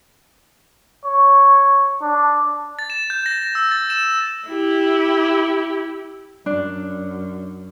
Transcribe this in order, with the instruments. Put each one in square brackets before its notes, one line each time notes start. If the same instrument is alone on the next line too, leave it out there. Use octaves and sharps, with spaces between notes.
[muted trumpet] C#5
D4
[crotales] A6
E7
G6
A#6
E6
A6
E7
[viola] E4 G4
[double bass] F#2 [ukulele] D4